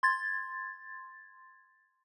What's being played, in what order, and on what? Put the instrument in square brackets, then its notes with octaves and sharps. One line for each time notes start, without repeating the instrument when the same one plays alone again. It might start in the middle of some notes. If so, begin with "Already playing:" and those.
[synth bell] C6 G#6 A6